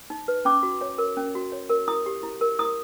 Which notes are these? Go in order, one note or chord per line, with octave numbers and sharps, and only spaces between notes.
D#4
B4
C#4 D6
F#4
C#5
A#4
C#4
F#4
C#5
A#4
E4 D#6
G4
E4
A#4
E4 D#6